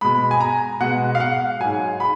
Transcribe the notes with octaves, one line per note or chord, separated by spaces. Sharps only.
B2 G#3 B5
G#5
A#5
B2 G#3 F#5
F5
F#5
G#2 F#3 G#5
B5